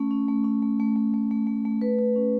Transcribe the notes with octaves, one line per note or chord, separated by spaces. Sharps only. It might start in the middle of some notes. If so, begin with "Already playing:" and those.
Already playing: A3 C#4
C#4
A3
C#4
A3
A3
A3
A3
A3
A3
A3
B4
B4
C#4